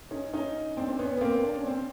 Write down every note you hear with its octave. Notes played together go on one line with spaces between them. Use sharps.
C#4 D#4
C#4 D#4
C4 D4
C4
B3 C#4
B3
A#3 C4
D4
C#4
C4